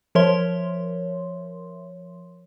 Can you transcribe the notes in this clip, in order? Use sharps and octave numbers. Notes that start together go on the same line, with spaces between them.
F3 A#4 C#5 E5 C6